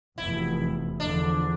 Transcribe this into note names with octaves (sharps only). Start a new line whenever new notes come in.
F1 E2 B2 E4
E2 D3 F3 D4